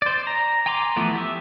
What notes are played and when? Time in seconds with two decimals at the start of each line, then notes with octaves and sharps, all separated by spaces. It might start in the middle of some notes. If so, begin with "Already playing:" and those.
0.02 C5 D5
0.27 A#5
0.66 G5 G#5 A#5 C6 D6
0.96 E3 F3 A3 B3
1.15 G4 E5